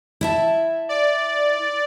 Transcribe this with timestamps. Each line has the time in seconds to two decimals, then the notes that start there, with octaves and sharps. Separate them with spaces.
0.21 E4 E5 A5
0.89 D5